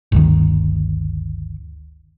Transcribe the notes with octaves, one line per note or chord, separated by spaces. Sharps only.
G1 D2 D#3